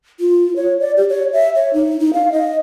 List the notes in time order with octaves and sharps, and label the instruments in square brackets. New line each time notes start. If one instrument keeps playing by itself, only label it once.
[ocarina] F4
C#5
D5
G4
C#5
E5
C#5
D#4
D#4
F5
D#5